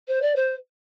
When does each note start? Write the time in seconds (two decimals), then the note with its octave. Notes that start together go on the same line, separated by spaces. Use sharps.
0.08 C5
0.21 D5
0.35 C5